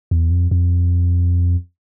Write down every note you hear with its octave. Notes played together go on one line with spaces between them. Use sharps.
E2
F2
F2